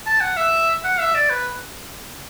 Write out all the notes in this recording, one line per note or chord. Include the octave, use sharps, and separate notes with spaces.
A5
F#5
E5
F#5
E5
D5
B4